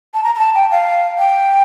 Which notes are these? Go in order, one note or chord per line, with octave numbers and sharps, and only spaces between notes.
A5
A#5
A#5
A5
G5
F5
G5